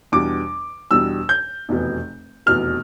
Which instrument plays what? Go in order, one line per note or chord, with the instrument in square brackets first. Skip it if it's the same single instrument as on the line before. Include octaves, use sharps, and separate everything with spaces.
[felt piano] E2 B2 G3 D4 [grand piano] D6
[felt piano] E2 B2 G3 D4 [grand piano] E6
[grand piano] G6
[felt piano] F1 E2 B2 B3
[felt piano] F1 E2 B2 B3 [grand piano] F6